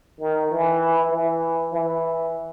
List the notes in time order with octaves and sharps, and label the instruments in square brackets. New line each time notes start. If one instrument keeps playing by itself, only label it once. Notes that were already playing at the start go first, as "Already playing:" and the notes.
[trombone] D#3
E3
E3
E3